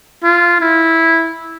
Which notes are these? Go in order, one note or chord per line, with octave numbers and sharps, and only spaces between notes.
F4
E4